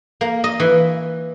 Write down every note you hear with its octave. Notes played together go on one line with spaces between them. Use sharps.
A#3
D#5
E3